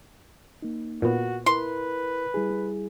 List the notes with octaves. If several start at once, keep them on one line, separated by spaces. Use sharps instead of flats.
A#3 D#4
A#2 B3 F#4
E4 A#4 B4 C6
G3 E4 G#4